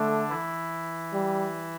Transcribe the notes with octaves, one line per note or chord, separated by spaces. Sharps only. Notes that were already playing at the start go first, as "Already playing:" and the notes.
Already playing: D3 A3 D4
E3 E4
G3